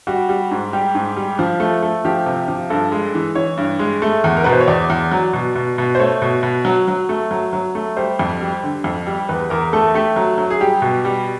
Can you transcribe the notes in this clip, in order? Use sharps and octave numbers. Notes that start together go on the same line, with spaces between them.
G3 F#4
G3
G#2
G3 G4
G#2
G3
F3
A3
A3
F3 G4
C3
F3
G2 A4
G#3
E3
E3 C#5
G2
G#3
A3
E2
A#4
B2 B4
C5
C#5
E2 D5
E2
F#3
B2
B2
B2
C5
A3 C#5
B2
B2
F#3
F#3
A3
F#3
F#3
A3
G3 C5
F2
G3
D3
F2
G3
E2 B4
E2 A#4
A3 A4
A3 G4
F#3
F#3
G#4
G3 G4
B2
G3